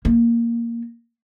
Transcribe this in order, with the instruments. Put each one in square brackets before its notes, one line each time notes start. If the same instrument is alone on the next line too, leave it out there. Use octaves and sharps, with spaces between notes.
[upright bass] A#3